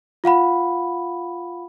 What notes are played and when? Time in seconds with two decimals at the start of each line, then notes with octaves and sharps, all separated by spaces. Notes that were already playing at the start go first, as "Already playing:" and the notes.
0.24 F4 F5 F#5 B5